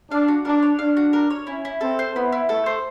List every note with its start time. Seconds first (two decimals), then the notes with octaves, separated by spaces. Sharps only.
0.11 D4 F5
0.28 F#4
0.45 D4 A#4
0.63 C#5
0.79 D4 F5
0.97 F#4
1.13 A#4
1.30 C#5
1.47 C#4 E4
1.65 E4
1.81 C4 A4
1.99 C5
2.15 B3 E4
2.32 E4
2.49 A3 A4
2.66 C5